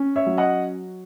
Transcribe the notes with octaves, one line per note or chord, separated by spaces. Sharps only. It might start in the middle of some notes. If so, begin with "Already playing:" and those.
Already playing: C#4
C#5 E5
F#3
D#5 F#5